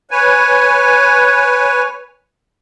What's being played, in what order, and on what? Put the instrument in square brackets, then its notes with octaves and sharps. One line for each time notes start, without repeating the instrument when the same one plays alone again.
[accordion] B4 C#5 G#5